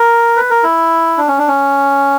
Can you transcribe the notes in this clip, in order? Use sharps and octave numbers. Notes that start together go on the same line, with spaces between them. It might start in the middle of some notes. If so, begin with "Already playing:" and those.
Already playing: A#4
B4
A#4
E4
D4
C#4
D4
C#4